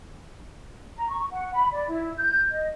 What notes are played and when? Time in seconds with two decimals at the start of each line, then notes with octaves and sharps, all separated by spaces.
0.96 A#5
1.09 C#6
1.31 F#5
1.53 B5
1.72 D5
1.88 E4
2.17 G6
2.51 D#5